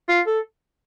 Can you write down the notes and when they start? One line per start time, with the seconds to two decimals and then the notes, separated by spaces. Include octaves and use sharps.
0.08 F4
0.27 A4